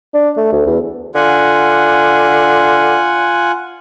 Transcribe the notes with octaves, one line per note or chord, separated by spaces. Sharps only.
D4
A3
D2
E2
D3 F4 F#5 G#5